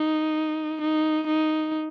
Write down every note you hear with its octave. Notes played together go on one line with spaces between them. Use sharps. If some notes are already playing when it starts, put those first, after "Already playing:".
Already playing: D#4
D#4
D#4